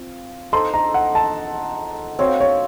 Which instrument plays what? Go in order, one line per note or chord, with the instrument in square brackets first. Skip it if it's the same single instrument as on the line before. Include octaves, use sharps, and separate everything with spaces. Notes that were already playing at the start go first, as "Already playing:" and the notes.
Already playing: [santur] C4 F4
[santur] D#4 A4 C5 [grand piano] C6
[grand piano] A#5
F#5
A5
[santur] C4 F#4 C5 F5 [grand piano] C#5
[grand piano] C#5